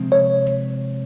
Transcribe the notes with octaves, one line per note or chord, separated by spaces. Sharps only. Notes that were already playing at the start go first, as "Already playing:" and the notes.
Already playing: C3 F3 G#3 C4
C#5